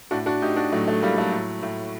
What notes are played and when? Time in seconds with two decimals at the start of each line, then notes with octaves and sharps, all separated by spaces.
0.11 A2 D4 F#4
0.26 D4 F#4
0.42 A2 D#4 G4
0.56 D4 F#4
0.72 A2 F#3 A3
0.87 F#3 A3
1.02 A2 G3 A#3
1.18 F#3 A3
1.32 A2
1.63 A2